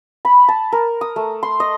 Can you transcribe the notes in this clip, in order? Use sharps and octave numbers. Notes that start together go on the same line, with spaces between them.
B5
A5
A#4
D#6
A3
C6
D#5